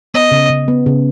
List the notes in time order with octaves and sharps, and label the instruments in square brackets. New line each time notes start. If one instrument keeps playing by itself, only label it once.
[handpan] B3 [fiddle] D#5
[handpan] C#3
C#3
B3
C#3